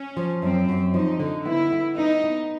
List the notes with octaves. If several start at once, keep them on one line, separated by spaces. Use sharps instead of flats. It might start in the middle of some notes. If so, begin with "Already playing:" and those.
Already playing: C#4
F3
F#2 C4
F#2
F3 D#4
D3
B3 E4
B3
B3 D#4
B3